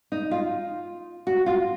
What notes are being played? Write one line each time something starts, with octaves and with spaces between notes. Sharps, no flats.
D#4
F4
F#4
F4